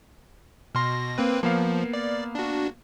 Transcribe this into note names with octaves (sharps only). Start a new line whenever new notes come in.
B2 C6 F6 A#6
A#3 C4 B4
F3 A#3 B3 F5
D5
D4 F#4